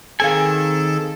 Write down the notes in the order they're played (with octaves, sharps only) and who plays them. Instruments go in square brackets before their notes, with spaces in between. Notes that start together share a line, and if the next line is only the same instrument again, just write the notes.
[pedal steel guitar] D#3 C4 G#5 [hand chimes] G#4 F5 [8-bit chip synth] A4